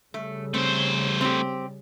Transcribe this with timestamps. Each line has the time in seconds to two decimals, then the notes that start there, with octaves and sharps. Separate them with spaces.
0.14 C#3 G3 A3
0.54 A3 C4 C5
1.21 C4 G4